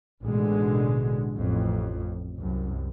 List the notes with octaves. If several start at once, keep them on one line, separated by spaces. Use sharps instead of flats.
A1 B2 D3 G#3
A1 F2
C2 F#2